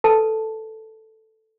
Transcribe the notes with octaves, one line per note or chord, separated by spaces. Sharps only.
A4 B4 A5